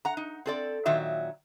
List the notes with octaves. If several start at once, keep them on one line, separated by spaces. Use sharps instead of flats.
F#5 A#5
D#4
C4 A4 D5
A#2 D#3 F#3 E5